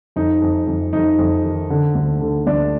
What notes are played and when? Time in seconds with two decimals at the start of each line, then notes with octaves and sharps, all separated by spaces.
0.16 F2 D#4
0.42 F2
0.67 F2
0.93 F2 D#4
1.19 F2
1.44 D#3
1.70 D3
1.95 D2
2.21 D3
2.47 D2 D4